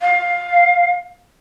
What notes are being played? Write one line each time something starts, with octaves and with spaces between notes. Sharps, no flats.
F5